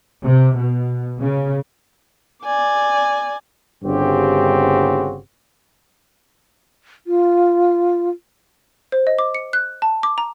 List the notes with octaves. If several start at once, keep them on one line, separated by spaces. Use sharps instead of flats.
C3
B2
C#3
D5 G#5
G1 G2 C#3 C4 F#4 G4
F4
C5
D#5
D6
C#7
F#6
A5
D6
A#5